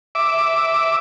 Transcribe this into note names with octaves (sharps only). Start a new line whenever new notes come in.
E5 D6